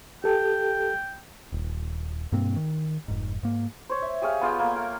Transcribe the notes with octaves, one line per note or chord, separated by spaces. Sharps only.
G4 A4 G5
D#1
G2 B2 A#3 C4
D#3
F1 G#2
G#2 A#3
C5 C#5
E5
G4 G#4 C#5 F5
B3 F4 G#4 G5
A3 A#3
A#4